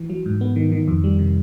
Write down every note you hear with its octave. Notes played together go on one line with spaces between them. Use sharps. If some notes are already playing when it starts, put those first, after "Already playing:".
Already playing: E3
F#3
G#2
B3
D#3
D#3
F2
G3
C3